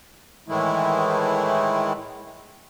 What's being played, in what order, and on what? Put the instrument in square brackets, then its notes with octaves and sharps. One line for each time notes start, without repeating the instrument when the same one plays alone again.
[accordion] A2 D#3 E3 G#3 A3 E4